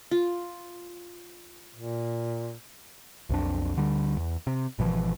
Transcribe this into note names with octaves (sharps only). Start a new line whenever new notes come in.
F4
A#2
B1 F2 D4
D2 D3 G3
E2
C3
G#1 B2 E3 F3